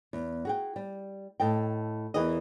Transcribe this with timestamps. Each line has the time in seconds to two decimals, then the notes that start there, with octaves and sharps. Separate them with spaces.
0.13 E2
0.45 F#4 G#4 G5
0.76 G3
1.40 A2 A4 D#5 G5
2.14 E2 E3 G#4 A#4 D#5